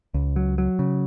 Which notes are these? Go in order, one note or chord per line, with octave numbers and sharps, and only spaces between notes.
C#2
F#3
F#3
C#3